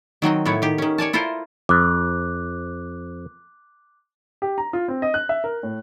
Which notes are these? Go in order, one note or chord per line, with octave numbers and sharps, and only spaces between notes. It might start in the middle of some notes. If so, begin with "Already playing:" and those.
D#3 F#3 C4 D#5
A2 B3 E4 C#5
D#3 G4
D#3 C#4
C#5 D5 G#5 A5
E4 F4 A4 A#4 C5
F2 D6 F#6
G4
A#5
F4
C4
D#5
F#6
E5
A#4
A2